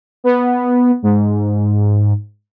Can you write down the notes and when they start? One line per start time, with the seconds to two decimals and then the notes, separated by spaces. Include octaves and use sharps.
0.24 B3
1.02 G#2